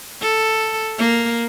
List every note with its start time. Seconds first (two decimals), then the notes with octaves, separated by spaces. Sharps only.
0.21 A4
0.98 A#3